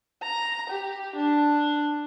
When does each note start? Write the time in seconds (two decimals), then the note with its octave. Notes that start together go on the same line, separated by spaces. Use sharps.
0.23 A#5
0.70 G4
1.16 D4